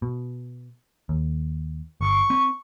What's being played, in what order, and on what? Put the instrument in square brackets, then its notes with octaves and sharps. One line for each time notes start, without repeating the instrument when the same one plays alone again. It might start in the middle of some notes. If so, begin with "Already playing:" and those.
[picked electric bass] B2
D#2
[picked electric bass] G1 [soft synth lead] C#6
[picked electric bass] C4